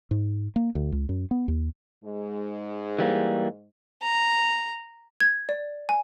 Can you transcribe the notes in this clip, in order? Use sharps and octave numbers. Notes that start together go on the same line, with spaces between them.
G#2
A#3
D2
C#2
F#2
B3
D#2
G#2 G#3
E3 G3 A#3
A#5
G#6
D5
G#5